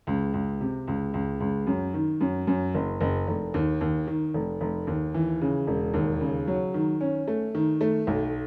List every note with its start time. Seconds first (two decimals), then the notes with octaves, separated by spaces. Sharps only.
0.07 C#2
0.34 C#2
0.61 C3
0.87 C#2
1.14 C#2
1.40 C#2
1.67 F#2
1.94 D#3
2.21 F#2
2.47 F#2
2.74 F#1
3.01 F#1
3.28 F1
3.54 D#2
3.81 D#2
4.07 D#3
4.34 F1
4.61 F1
4.87 D#2
5.14 E3
5.41 C#3
5.67 E1
5.94 D#2
6.21 C#3
6.48 F#3
6.74 D#3
7.01 C#4
7.28 A3
7.55 D#3
7.81 A3
8.07 B1